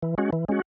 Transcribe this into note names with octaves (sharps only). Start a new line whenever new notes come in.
E3
G#3 C#4 F#4
E3
G#3 C#4 F#4